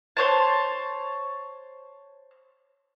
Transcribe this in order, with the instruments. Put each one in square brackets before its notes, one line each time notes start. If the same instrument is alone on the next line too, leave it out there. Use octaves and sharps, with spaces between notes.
[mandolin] C5 C#5 A5